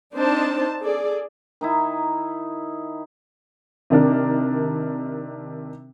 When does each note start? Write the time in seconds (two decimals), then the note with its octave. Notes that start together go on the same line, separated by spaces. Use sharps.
0.14 C4 D4 D#4 C5 A5
0.82 G#4 A4 D5
1.61 D#3 D#4 E4
3.90 C3 D#3 D4 A#4